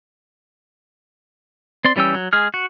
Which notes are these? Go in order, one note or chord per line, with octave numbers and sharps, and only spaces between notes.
C4 D5 C6
E3 G3 C#4 G5 E6
F#3
G#3 G#4 F6
F#4